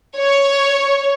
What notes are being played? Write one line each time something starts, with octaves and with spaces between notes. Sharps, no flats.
C#5